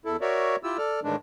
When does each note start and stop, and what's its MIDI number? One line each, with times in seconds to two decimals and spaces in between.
0.05 0.17 40
0.05 0.17 64
0.05 0.17 69
0.21 0.56 66
0.21 0.56 70
0.21 0.56 73
0.21 0.56 74
0.21 0.56 76
0.63 0.77 64
0.63 0.77 65
0.63 0.77 67
0.63 0.77 88
0.78 1.00 69
0.78 1.00 74
0.78 1.00 89
1.03 1.16 45
1.03 1.16 51
1.03 1.16 52
1.03 1.16 56
1.03 1.16 62